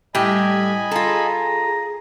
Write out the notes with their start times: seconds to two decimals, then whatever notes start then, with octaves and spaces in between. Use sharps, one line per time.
0.15 A2 G3 G4 D#5 G#5 B5 G#6
0.91 F4 G#4 A4 A#5